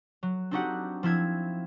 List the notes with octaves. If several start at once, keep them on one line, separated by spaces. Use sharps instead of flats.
F#3
C4 D4 D#4 F#4 G4 F#5
F3 C4 E4 G#6